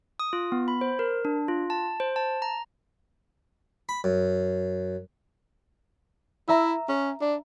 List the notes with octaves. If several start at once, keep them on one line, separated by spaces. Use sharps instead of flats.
D#6
F4
B3
B5
C5
A#4
D4
F4
A5
C5
A5
A#5
B5
F#2
E4 E5 A#5
C#4
D4